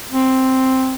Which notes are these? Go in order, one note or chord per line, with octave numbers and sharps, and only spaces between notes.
C4